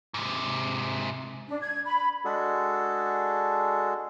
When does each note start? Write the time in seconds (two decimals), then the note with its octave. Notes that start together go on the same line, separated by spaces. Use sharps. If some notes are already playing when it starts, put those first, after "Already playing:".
0.14 G#2 C3
1.48 D4
1.61 G#6
1.85 B5
2.25 G#3 D4 F#4 G#4 A4